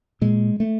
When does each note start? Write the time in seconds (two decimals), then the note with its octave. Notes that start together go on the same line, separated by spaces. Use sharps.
0.21 A#2 G#3
0.60 A3